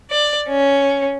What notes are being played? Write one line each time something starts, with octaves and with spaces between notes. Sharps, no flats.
D5
C#4